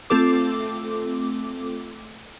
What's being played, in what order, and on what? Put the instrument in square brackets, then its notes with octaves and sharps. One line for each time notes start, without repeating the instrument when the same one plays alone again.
[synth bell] A3 C4 F4 A4 D6